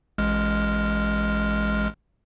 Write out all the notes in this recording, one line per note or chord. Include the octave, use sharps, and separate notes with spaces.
A1 G#3 F6